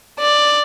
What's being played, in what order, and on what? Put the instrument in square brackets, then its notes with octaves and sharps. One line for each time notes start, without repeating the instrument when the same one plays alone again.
[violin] D5